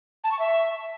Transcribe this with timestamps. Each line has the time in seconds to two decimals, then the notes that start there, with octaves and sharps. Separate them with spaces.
0.24 A5
0.32 C#6
0.39 E5